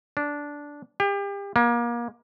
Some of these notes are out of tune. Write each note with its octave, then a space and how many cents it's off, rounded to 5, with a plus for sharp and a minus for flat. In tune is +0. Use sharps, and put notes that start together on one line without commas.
D4 -10
G4 +35
A#3 +30